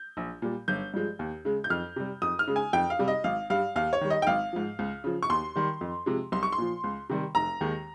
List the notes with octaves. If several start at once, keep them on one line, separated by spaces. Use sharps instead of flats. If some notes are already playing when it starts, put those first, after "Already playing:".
Already playing: G6
A#1
A#2 G3
G1 G6
G2 F3 G#3
D#2
C#3 G#3
G6
F2 F6
C3 G3
F2 D#6
F6
C#3 G#3
G#5
F2 G5
F5
C3 G3
D#5
G#1 F5
G2 G3 F5
D#2 F5
C#5
D#3 G3
D#5
G5
G#1 F5
G#2 F3
C#2
C#3 F3
C#6
D#2 C6
D#3 G3
F2
C3 F3 G#3
C2 C6
C#6
C6
A#2 F3
C#2
C3 D#3 G3
F1 A#5
D#2 D#3 G#3